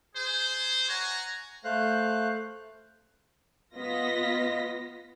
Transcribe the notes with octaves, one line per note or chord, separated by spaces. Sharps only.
G#4 C5
C#5 F#5 G#5 A#5
A3 C5 F5 F#6
B3 F4 D#5 A#6 B6